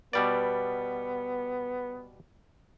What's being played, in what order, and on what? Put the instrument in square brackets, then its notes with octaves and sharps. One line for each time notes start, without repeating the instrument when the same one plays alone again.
[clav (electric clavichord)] B2 G3 D5 [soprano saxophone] B3